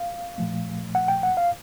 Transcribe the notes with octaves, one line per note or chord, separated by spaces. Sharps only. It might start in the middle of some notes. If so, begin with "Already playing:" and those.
Already playing: F5
A#2 F3 A3
F#5
G5
F#5
F5